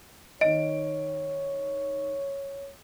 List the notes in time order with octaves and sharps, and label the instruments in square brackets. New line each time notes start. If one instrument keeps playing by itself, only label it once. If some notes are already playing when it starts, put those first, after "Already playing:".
[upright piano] D#3 D7 [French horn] C#5 [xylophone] D#5